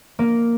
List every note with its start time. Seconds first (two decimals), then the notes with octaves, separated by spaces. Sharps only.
0.19 A#3